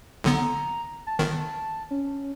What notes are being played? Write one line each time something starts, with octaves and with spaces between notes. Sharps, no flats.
B1 D3 B3 A#5
A5
G1 D#3
C#4